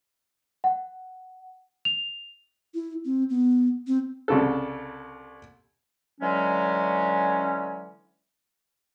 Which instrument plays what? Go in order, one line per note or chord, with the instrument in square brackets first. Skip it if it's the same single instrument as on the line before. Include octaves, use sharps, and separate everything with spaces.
[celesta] F#5
F7
[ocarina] E4
C4
B3
C4
[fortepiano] C2 C#3 A4
[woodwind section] D3 E3 F#3 G#3 C#4